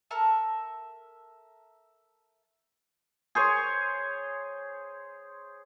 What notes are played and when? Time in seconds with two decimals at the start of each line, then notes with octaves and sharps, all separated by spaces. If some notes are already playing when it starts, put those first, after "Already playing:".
0.11 A4 A#4 E5 A5
3.35 G#4 C5 C#5